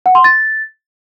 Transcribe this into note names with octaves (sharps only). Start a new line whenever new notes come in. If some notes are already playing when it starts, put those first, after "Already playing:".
F#5
C6
A6